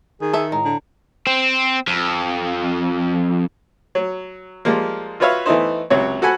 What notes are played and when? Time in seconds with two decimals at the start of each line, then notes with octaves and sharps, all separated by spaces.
0.21 D#3 G#4
0.33 A4 E5
0.52 A2 G#3 A#5
0.65 D3
1.27 C4
1.87 F2
3.95 F#3
4.65 F3 G3 G#3 A#3
5.20 F4 F#4 B4 C#5 E5 F5
5.46 E3 A3 B3 D#4 C5
5.90 C#2 C3 F#3 C#5
6.22 F#4 A4 F#5 G#5 B5